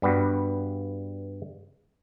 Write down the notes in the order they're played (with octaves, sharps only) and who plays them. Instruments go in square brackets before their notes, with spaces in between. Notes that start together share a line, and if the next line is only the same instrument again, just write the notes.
[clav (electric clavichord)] G2 G3 B3 F#4